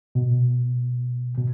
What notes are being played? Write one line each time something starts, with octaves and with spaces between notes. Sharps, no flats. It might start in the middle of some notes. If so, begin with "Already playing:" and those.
B2
B2